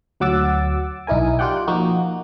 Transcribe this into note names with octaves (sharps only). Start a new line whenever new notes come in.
D2 F#3 F#5 D6 E6 A6
B1 D#4 E4 A#4 G#5
F4 G4 D5 F#5 G5
F3 A#3 D#4 F#4